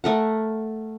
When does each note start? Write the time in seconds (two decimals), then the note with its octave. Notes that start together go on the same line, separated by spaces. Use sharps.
0.04 A3 A#4 F#5